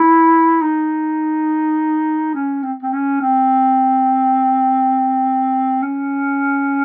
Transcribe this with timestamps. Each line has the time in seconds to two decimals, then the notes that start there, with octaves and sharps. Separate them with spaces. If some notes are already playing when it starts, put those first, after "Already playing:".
Already playing: E4
0.61 D#4
2.34 C#4
2.63 C4
2.83 C4
2.93 C#4
3.21 C4
5.82 C#4